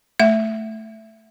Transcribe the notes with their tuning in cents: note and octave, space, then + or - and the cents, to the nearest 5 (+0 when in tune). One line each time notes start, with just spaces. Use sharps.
A3 +0 E5 +10